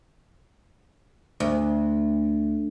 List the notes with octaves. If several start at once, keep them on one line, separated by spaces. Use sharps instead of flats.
D2